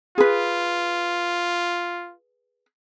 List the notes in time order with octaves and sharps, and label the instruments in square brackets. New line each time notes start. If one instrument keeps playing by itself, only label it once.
[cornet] F4 [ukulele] G#4 B4